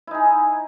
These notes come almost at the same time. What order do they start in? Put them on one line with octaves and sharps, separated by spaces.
E4 D#4 G#4